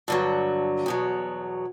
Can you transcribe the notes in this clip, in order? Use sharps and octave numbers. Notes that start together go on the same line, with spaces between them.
G2 D3 F#3
E2 B2 F#3